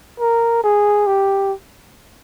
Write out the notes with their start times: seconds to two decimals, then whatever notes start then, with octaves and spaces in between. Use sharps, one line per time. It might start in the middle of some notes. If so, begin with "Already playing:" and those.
0.20 A#4
0.64 G#4
1.07 G4